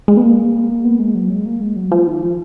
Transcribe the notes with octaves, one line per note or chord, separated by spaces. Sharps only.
G#3
B3
A#3
B3
G#3
F#3
G#3
A#3
G#3
F#3
F3
D#3
F3